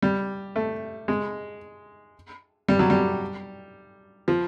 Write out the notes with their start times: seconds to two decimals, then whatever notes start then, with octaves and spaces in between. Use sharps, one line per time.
0.02 G3
0.56 A3
1.08 G#3
2.68 G3
2.79 F#3
2.90 G3
4.28 F3